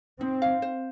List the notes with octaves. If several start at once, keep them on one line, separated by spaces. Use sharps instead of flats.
C4 D#4
F5
C5